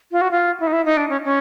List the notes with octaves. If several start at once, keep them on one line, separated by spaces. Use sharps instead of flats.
F4
F#4
F4
E4
D#4
E4
D#4
D4
C#4
C#4